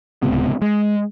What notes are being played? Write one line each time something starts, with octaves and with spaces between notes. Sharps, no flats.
D1 C#2 C3 B3
G#3